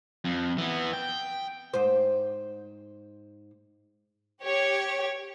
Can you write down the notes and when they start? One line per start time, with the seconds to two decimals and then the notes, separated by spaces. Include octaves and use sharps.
0.24 F2
0.58 E3 B3
0.93 G5
1.74 G#2 C5
4.42 G4 C#5